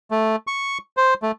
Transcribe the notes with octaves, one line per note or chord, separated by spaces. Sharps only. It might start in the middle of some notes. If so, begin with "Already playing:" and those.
A3
C#6
C5
A3